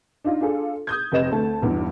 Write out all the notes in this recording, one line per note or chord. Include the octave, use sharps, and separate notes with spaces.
D4 D#4 F4
D4 F4 G#4 A4
D#6 G6 G#6
F1 G4 B4 D#5 E7
D2 A3 A5
B1 E2 G2